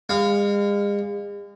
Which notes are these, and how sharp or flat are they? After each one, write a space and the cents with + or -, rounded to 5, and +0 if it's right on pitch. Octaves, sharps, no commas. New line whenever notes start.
G#3 -40 F5 +0